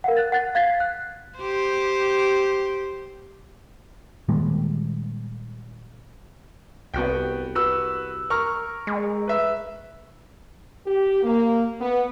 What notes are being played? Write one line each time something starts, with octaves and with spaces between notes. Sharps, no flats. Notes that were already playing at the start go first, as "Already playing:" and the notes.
A#4 F5 F#5
F#6 A6
F#5 F#6 A6
F5 G#6 A6 B6 C7
F#6
G4 C5
A#2 D#3 G3 G#3
C2 B3 F#4 G5
F#4 B4 E6
A#4 C#6 F6
G#3
B4 E5
G4
A#3
B3